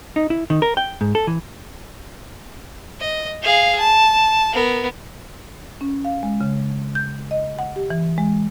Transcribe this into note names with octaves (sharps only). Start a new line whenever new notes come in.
D#4
E4
D#3
A#4
G5
G#2
A4
E3
D#5
G#4 F5
A5
B3 A#4
C#4
F5
G#3
C#3
G6
D#5
F#5
G4
E3
G#3